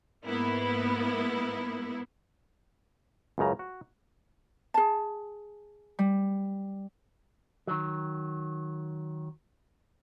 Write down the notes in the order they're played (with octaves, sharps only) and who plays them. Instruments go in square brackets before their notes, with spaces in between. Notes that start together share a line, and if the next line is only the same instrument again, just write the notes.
[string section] G#2 A#3 B3 E4
[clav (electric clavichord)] C#2 F#2 C#3 A#5
F#4
[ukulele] G#4 A5
[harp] G3
[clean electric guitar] D#3 F#3